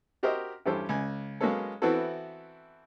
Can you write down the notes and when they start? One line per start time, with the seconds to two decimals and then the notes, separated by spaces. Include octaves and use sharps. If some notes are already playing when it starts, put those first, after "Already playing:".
0.23 F#4 G4 A#4 C5 D#5 E5
0.66 E2 G2 C#4 G4 A4 C5
0.89 C#2 G#5
1.41 F#3 G#3 A#3 B3 C#4 A4
1.82 E3 B3 C4 E4 F#4 A4